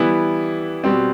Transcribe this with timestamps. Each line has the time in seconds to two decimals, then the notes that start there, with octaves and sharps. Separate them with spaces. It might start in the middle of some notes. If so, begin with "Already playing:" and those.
Already playing: E3 G3 B3 E4
0.84 B2 G3 C4